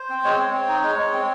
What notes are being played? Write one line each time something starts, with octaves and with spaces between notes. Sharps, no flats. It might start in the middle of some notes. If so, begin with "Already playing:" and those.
Already playing: C5
C4
G#3 C#5
C4
C4
D#4
G#3
G#3
C4